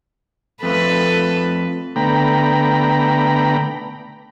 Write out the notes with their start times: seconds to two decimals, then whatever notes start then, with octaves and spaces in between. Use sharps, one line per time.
0.63 F2 A3 F4 A4 B4
1.96 D3 A3 B3 G5 A#5 B5